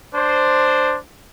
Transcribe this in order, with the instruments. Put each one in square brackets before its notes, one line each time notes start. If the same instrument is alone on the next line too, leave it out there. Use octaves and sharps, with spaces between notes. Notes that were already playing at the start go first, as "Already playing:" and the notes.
[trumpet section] D4 C5